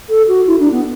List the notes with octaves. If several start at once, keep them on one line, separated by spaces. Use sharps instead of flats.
A4
F#4
E4
D4
B3